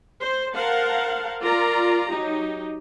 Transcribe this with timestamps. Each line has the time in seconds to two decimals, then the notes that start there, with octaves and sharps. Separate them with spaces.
0.21 C5
0.54 A#4 C5 F5 F#5 A5
1.42 F4 A#4 D5 A#5
2.11 F#3 D#4 G4